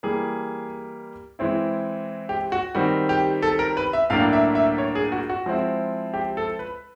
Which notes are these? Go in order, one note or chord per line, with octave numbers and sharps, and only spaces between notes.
E3 G3 A#3 G#4
E3 G#3 C4 E4
G4
F#4
D#3 G3 C4 F#4
G4
A4
A#4
B4
E5
A2 F#3 A#3 D4 F5
E5
E5
C#5
G#4
F#4
F#4
F3 G#3 C4 E4
G4
A4
B4